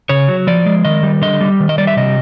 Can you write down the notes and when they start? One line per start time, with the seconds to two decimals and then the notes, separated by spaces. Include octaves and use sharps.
0.09 C#3 C#5
0.28 F#3
0.47 F3 D5
0.66 G#3
0.85 D#3 D#5
1.03 G3
1.22 D3 D#5
1.41 G3
1.60 D#3
1.69 D#5
1.78 G3 D5
1.87 E5
1.97 C3 D#5